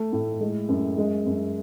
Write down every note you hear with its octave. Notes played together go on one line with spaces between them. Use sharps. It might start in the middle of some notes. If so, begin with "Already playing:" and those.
Already playing: A3
A2
G#3
F#2
G#3
F#2